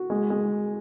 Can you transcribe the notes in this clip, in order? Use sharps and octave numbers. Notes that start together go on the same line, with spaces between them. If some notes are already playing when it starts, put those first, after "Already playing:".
Already playing: F#4
G#3
G#3